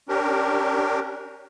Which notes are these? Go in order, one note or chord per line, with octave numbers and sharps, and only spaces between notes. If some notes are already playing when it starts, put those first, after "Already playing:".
C#4 D4 G4 A#4